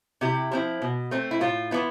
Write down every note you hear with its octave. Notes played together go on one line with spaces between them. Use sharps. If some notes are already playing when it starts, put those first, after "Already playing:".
C3 E4 G4
F3 C4 E4
B2
A3 C4
E4
A2 F4
E3 B3 E4